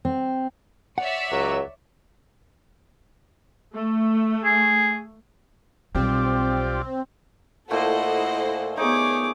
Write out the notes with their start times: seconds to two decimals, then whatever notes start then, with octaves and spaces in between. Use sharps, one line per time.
0.05 C4
0.98 C#5 D5 E5 F#5
1.32 C#2 F#3
3.75 A3
4.44 G#4
5.95 B1 G3 C4 F4 G4 D5
7.71 A#2 A3 E4 A4 C5 D#5 F#5
8.77 B3 D#4 G#4 C#5 D6